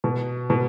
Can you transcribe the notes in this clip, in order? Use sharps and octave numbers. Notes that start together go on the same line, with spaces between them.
B2
B2